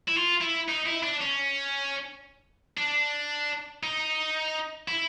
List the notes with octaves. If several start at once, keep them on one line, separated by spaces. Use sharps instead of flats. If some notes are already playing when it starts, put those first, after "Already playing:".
E4
F4
E4
D#4
E4
D4
C#4
D4
D#4
E4